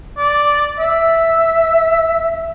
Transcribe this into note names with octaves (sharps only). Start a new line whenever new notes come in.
D5
E5